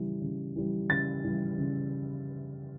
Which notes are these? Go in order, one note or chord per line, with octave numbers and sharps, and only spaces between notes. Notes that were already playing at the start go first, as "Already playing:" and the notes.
Already playing: C#3 E3 G3
C#3
E3 G3
C#3 A6
E3 G3
C#3